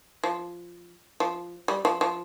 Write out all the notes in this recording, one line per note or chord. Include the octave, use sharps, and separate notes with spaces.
F3
F3
G3
F3
F3